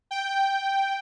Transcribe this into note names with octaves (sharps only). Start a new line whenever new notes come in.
G5